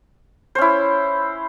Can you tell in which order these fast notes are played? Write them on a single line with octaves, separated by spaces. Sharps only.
C5 C#4 E4